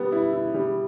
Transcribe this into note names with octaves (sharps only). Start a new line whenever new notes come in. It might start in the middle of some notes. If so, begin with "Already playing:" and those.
Already playing: G3 B3
E4
E4
G3